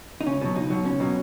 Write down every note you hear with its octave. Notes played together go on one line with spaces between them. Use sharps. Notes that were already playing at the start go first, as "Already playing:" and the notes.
D#4
C#2 C#4
B2 F#3
C#2 D#4
B2 F#3
C#2 C#4
B2 F#3